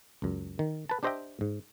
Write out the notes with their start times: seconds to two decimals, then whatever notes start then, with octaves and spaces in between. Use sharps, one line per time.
0.22 C#2 F#2
0.59 D#3
0.89 B4 A5
1.03 D4 G4 C5 D#5 E5 G5
1.41 G#2